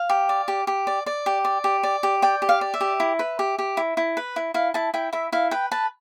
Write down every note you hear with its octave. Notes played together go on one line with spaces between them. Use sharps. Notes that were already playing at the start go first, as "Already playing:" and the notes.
Already playing: F5
G4
D5
G4
G4
D5
D5
G4
D5
G4
D5
G4
D5 G5
G4
F5
D5
E5
G4
E4
B4
G4
G4
E4
E4
B4
E4
E4 F5
E4 A5
E4 G5
E4 E5
E4 F5
B4 G5
B4 A5